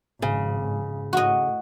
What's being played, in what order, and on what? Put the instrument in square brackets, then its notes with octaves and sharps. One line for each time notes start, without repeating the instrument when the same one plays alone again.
[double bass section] G#1 F2 [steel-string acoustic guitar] C#3
[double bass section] A2 [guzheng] F#4 D#5